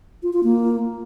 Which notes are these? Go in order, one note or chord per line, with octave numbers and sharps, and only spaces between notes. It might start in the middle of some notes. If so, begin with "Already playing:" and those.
F4
F4
A#3